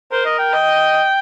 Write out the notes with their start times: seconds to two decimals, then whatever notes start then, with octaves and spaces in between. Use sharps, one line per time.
0.12 A#4 C5
0.26 D#5
0.39 G5
0.53 D#5